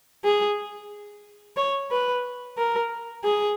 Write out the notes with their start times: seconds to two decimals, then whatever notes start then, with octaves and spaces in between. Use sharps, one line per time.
0.24 G#4
1.57 C#5
1.91 B4
2.58 A#4
3.24 G#4